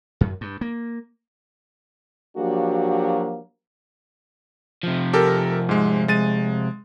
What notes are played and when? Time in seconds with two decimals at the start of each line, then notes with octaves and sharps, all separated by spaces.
0.21 F#2
0.41 G2
0.61 A#3
2.37 F3 F#3 A#3 D4 F#4 G4
4.83 C3 F3
5.13 G4 A4 A#4
5.69 G#2 G#3
6.08 G#3 A6 D#7